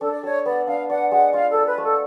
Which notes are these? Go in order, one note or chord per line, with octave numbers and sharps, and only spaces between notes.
D4 A4
D5
A4 C#5
B3 D5
D4 F5
D5 F#5
G#3 F#5
F4 F5
A4
D5
B4
A3
A4